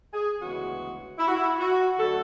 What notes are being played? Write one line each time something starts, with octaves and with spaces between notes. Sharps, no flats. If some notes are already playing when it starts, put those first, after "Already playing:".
G#4
D2 C#3 E3 G#3 B3 F#4
E4
F#4
E4
F#4
D2 D3 F#3 A3 A4